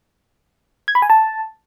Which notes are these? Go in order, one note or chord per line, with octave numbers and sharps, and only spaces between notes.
G#6
B5
G#5
A5